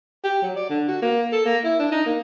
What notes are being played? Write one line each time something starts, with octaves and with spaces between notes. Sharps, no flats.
G4
F#3
D5
D3
F#4
A#3
A4
A#3
E4
D4
D#4
A#3